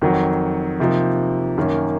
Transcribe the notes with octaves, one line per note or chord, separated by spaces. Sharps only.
F2 D#3 F#3
C3 F3 A#3 D#4
F#2 D#3 A#3 C#4